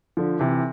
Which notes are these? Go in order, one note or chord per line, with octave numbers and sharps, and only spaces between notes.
D3 F3
C3 E3